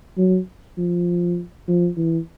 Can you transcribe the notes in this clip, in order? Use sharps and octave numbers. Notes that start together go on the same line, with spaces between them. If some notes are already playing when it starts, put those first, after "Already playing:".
F#3
F3
F3
E3